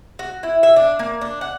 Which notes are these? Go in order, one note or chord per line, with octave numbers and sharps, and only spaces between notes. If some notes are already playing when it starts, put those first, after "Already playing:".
F#4
E4
E5
D4
A#3
D4
F#5